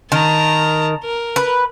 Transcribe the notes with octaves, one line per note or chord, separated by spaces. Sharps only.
D#3 A5 A#5
A#4
B4